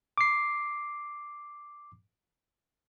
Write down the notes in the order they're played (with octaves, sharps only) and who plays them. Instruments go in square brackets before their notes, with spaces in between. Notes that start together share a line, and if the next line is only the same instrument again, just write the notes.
[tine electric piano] D6 C7